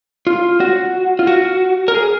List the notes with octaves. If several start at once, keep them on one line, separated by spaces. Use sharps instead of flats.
F4
F#4
F4
F#4
A#4
G#4